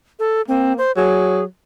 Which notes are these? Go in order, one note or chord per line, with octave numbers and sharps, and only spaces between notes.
A4
A#3 C4
C5
F#3 G#4